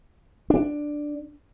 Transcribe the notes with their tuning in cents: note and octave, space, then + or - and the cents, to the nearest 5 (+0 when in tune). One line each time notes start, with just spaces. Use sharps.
D4 +5